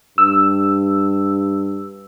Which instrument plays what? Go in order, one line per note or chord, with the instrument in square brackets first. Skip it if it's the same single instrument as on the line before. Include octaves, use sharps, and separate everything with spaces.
[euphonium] G2 [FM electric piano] E6